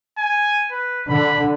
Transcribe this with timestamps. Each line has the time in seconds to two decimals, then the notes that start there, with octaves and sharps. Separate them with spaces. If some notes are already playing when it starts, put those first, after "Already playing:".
0.18 G#5
0.72 B4
1.08 D3 B5